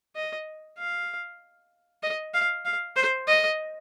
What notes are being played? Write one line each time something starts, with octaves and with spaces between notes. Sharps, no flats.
D#5
F5
D#5
F5
F5
C5
D#5